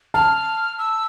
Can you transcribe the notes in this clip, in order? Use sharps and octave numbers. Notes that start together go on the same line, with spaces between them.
A5 F6
E6